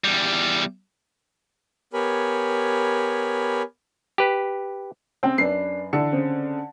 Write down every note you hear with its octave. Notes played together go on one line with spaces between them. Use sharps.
E2 G3
B3 G4 A#4 C#5 G#5 B5
G4 B4
C#3 C4 G5
F#2 D4 B4 C7
D3 E3 E6 C#7
C#3 C4